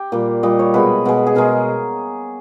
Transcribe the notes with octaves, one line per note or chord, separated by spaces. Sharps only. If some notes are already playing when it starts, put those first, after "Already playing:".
Already playing: G4
A#2 G3
A#2 G3 D#5
C#5
B2 G#3 B4
B2 G#3
G#4
B2 G#3 A#4